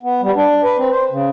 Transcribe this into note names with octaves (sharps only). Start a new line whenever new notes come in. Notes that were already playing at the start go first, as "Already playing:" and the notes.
B3
G3
D4
B4
C4
C5
C#3